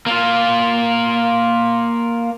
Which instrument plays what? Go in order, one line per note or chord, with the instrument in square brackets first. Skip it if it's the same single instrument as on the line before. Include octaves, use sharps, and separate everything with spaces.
[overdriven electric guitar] A#3 F4